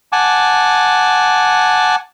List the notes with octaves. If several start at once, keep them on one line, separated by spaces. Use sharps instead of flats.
F#5 G#5 A5 D6